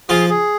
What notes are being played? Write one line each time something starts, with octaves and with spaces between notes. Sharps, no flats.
F3 F4 G#4
G#4